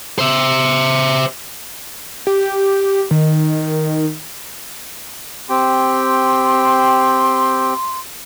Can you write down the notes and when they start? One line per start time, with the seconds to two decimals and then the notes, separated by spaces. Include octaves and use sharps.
0.19 C5 E5
2.27 G4
3.11 D#3
5.49 C4 G4 G5 C6